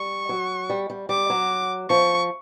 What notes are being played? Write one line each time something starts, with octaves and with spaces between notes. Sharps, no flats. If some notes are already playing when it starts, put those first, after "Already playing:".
Already playing: G3 C#6
F#3
G3
G3
G3 D6
F#3
F3 C#6